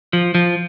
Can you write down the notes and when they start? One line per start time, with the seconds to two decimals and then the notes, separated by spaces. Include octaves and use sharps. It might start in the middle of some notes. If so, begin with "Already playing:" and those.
0.13 F3
0.35 F3